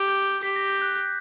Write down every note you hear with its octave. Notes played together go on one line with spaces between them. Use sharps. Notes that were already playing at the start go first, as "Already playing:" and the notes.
Already playing: G4
G6
G4 B6
A#6
G6
F#6
G6